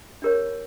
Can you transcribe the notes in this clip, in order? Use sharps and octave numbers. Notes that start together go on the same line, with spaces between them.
D4 G4 A#4 C#5